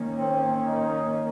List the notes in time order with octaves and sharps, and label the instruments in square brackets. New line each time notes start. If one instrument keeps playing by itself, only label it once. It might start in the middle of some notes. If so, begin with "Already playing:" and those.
Already playing: [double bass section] D#3 A#3 C#4
[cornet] C4
D#4